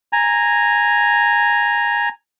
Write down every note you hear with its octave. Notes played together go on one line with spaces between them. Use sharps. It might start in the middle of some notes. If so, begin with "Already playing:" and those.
G#5 A#5